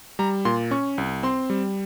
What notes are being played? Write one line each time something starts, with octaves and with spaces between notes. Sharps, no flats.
G3 A#5
A#2 C6
C#4 C#6
C2
C4 C6
G3